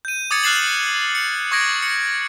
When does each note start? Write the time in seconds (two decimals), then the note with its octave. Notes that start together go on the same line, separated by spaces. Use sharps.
0.05 G6 D#7
0.31 D6 D#6 G#6 A6 C#7
0.43 F6 F#6 A6 C7 E7 F#7
1.15 C#7
1.52 C#6 D#6 G#6 A#6 D7
1.82 C#7